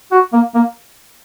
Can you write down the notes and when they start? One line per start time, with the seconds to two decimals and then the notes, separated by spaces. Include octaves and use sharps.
0.12 F#4
0.33 A#3
0.55 A#3